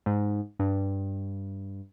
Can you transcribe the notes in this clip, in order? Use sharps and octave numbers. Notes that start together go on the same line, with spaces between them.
G#2
G2